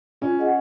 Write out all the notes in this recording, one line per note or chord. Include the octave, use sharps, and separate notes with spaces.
C#4 F4
G#4 D#5 F#5